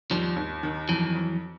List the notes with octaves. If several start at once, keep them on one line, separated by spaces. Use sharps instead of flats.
D#2 F3 G3
D#2
D#3
F2 E3 F#3
F2